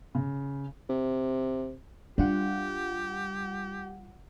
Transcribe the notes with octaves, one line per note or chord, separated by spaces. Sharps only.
C#3
C3
G3 D4 F4 G4 F#5